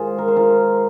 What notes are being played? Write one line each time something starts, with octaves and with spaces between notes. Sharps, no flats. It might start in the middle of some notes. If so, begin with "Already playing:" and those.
Already playing: G#2 D#3 F4 G#4 C5
A#4
C5
F4 A#4